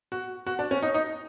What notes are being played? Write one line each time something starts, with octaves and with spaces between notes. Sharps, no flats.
F#4
F#4
D4
C#4
D#4
D#4